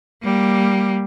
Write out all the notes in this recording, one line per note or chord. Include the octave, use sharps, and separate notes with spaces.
G3 A#3